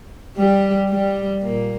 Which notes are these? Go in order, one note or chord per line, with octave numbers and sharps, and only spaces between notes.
G3 G4
G3 G4
A#2 A#3